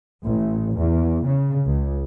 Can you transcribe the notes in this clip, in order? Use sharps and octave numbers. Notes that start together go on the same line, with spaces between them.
A1
E2
C#3
C#2